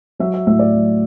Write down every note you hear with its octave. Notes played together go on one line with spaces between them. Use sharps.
F#3 E5
E5
A2 E5
D5
F#3